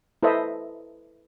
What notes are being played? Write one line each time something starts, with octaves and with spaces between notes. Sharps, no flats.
E4 A4 B4 C5 D#5 E5